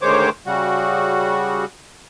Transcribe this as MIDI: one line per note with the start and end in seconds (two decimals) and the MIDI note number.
0.02 0.29 38
0.02 0.29 51
0.02 0.29 56
0.02 0.29 72
0.02 0.29 73
0.02 0.29 86
0.46 1.65 49
0.46 1.65 55
0.46 1.65 66